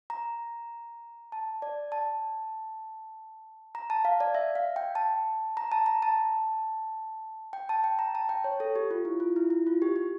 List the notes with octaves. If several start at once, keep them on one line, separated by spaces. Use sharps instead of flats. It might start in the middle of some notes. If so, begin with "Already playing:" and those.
A#5
A5
D5
A5
A#5
A5
F5
D5
E5
F5
G5
A5
A#5
A5
A#5
A5
G5
A5
G5
A#5
A5
G5
C#5
A4
G4
F4
E4
F4
E4
E4
F4
G4
G4